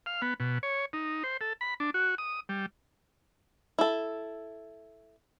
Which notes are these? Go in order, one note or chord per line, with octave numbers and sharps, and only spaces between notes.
F5
B3
B2
C#5
D#4
C5
A4
B5
D4
F#4
D#6
G3
E4 A4